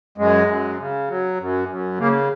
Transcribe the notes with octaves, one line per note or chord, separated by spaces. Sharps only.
F#2 G#3
F#2
C#3
F#3
F#2
F#2
C#3 A#3